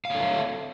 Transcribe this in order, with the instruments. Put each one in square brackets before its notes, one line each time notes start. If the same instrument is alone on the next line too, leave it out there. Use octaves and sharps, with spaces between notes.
[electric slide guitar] F5
C#5
A4
E5